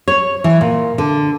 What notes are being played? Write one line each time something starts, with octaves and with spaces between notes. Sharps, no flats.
C#5
E3
A#2
D3